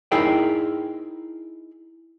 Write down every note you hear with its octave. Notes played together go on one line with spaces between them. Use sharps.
D#4 E4 G#4 A#4 E5 G5